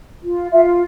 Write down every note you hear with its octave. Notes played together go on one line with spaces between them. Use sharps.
F4
F4 E5